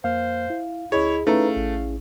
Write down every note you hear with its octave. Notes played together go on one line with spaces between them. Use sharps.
F2 A#3 C5 F5 F6
E4
D2 E4 G#4 C#5 D#5
A3 C#4 D#4 E4 G#4 B4 F5 A#5
A1